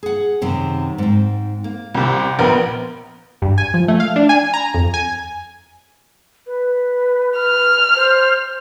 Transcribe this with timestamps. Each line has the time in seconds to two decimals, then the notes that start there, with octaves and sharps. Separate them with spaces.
0.03 G#4 F#5
0.41 F#2 C3 D#3
0.98 G#2 C4
1.64 A#3
1.95 C2 C3
2.39 A#1 B3 A#4
3.42 G2
3.58 G#5
3.74 F3
3.88 A3
4.00 F5
4.16 D4
4.29 G#5
4.54 A#5
4.74 F2
4.94 G#5
6.46 B4
7.39 F6
7.95 C5